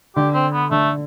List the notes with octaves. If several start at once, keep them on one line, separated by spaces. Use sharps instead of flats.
D3 G4
C4
B3
D3 A3